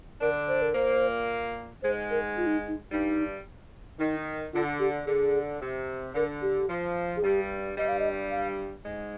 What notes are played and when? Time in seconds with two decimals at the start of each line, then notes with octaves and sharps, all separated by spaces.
0.21 D3 D4 A#4
0.48 C5
0.62 A#4
0.74 A#2 A#3 C5
1.82 G#2 G#3 C5
2.10 A#4
2.37 F4
2.46 D#4
2.68 D#4
2.91 G2 G3 D#4
3.99 D#3 D#4
4.53 D3 F4
4.79 G4
5.06 D3 G#4
5.61 C3
6.14 D3 A#4
6.41 G4
6.69 F3
7.16 G#4
7.23 G2 G3 G4
7.77 G2 G3 D#5
7.88 F5
7.99 D#5
8.31 F5
8.84 G#2 G#3